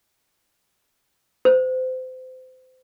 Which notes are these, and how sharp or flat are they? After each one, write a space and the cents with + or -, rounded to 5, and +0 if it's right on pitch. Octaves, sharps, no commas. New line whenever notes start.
C5 -30